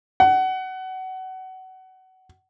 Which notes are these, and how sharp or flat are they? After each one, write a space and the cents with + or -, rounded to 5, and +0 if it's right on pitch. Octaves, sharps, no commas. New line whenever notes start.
F#5 +25